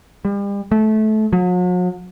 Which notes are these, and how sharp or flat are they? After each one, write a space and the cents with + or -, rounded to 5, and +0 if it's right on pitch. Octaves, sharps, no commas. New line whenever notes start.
G3 +40
A3 -20
F#3 -45